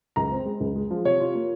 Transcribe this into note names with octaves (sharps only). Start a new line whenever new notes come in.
C#2 A#5
C4
G#3
C#2
G#3
F3
C3 C#5
F4
A#3